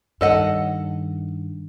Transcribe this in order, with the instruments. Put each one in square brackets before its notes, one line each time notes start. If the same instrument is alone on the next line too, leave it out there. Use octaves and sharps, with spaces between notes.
[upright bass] G2 D#3 [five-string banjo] A4 D#5 F#5